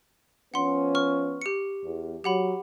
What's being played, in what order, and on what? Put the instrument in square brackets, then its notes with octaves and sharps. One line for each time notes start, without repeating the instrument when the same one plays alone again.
[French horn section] F3 B3 C#4 [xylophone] F#5 C6
[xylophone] C#6 F6
G4 C#7
[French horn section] E2
[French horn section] F#3 [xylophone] G4 F#5 B5